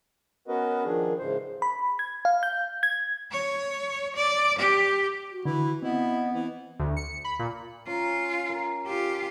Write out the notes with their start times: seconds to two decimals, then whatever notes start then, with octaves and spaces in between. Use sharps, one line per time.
0.48 B3 C#4 F#4 A#4 B4 D#5
0.84 D#3 F3 D4 G#4
1.19 G#2 C#3 E3 C5
1.62 B5
1.99 G#6
2.25 F5
2.43 G6
2.83 G#6
3.31 C#5
4.16 D5
4.58 G4
5.32 F#4
5.45 D3 E3 E4
5.82 B3 C4 E4 D#5
6.33 E3 C4
6.79 D2
6.97 C#7
7.24 B5
7.39 A#2
7.87 C#4 F4 A#5
8.49 A#4
8.87 F4 G4